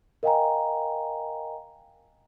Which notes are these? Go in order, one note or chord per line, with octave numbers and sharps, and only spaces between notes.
A#4 D#5 F5 G5 G#5 A#5